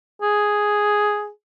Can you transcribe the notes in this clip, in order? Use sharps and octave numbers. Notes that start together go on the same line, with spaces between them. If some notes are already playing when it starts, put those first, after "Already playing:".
G#4